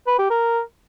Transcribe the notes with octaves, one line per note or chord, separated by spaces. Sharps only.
B4
G4
A#4